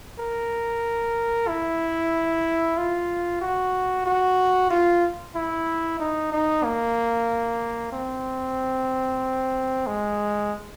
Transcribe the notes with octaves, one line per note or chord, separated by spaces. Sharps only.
A#4
E4
F4
F#4
F#4
F4
E4
D#4
D#4
A#3
C4
G#3